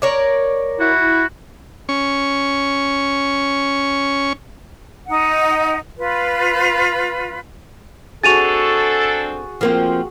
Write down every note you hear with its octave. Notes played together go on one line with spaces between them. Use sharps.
A#4 C#5 D5
E4 F#4
C#4 C#6
D#4 F#5
F4 B4
C4 D4 F#4 G#4 A4 A6 D#7 F7
F3 A#3 C4